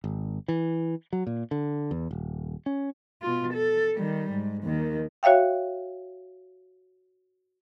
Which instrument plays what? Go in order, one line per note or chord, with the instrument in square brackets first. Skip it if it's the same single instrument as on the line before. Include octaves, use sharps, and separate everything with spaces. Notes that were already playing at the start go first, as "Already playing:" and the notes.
[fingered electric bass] G#1
E3
F#3
A#2
D3
E2
D#1
C#4
[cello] B2 F4
A4
D#3 G3
G#2
D#2 D#3
[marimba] F#4 C#5 E5 F5 G5